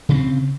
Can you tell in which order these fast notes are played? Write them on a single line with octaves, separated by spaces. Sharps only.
C#3 C#4 C4